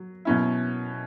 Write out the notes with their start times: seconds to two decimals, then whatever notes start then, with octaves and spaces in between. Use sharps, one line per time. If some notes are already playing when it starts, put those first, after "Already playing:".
Already playing: F#3
0.25 B2 F#3 C#4 E4